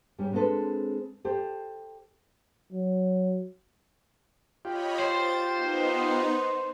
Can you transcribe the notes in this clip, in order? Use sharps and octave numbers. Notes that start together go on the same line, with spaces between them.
G#2 G3 C#4 G4
G#3 C4 D4 F#4 A4 B4
G4 A4 C5
F#3
F4 G4 C#5 D#5 B5
C5 A6
B3 D#4